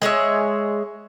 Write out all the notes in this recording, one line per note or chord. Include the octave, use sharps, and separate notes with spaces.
G#3 G#4 C#5 E5